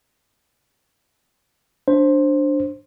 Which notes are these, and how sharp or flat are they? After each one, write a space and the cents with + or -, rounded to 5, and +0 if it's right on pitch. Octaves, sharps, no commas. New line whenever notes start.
D4 +0 C5 +10